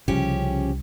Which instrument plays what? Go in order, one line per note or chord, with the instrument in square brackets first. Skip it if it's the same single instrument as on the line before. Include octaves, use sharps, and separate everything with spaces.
[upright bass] C2 G3 [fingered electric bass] C#3 F3 [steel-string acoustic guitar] C#4 G4